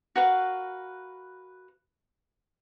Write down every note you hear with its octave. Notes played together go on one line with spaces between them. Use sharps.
F#4 A#4 B4 F5